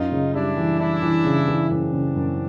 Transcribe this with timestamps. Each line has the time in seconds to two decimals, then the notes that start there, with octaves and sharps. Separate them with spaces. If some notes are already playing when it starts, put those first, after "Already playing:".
Already playing: F#2 D#4 F4
0.12 C#3
0.34 G3 D4 E4
0.57 E3
0.80 E3 D4 E4
1.03 E3
1.25 C#3
1.48 E3
1.70 F#2 C4 D4
1.93 C#3
2.16 F#2